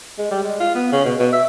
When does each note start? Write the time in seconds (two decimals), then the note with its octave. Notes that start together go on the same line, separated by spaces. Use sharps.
0.18 G#3
0.31 G3
0.43 G#3
0.60 F4
0.75 B3
0.93 C#3
1.05 B2
1.19 B2
1.33 E5